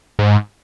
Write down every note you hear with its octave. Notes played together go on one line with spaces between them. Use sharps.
G#2